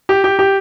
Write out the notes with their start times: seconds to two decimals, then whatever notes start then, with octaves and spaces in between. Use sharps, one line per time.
0.09 G4
0.24 G4
0.39 G4